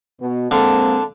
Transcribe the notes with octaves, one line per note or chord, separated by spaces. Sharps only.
B2
D3 G#3 A#3 C4 F5 A5